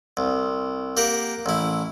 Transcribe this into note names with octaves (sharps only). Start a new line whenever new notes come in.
C2
A#3 G4 F#5 A#5
A1 E4